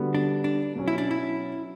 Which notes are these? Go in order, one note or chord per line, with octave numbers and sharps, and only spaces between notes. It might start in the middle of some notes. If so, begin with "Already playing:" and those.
Already playing: D3 G3 B3 F#4
D4
D4
B2 F#3 C#4
E4
D4
E4